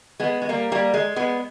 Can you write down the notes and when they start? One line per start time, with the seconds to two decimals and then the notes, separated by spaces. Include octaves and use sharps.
0.20 G#3 B3
0.42 G#3
0.49 G3 A#3
0.72 G3 A#3
0.94 G#3
1.16 G#3 B3